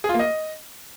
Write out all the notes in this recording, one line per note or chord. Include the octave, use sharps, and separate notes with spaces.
G#4
F4
A#3
D#5